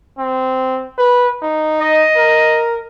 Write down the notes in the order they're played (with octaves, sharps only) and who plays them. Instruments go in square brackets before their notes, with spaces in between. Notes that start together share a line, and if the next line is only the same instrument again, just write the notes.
[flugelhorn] C4
B4
D#4
[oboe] D#5
[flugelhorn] A#4